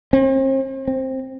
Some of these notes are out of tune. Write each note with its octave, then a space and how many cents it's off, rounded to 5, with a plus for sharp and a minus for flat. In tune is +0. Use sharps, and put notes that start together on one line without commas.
C4 +40
C4 +10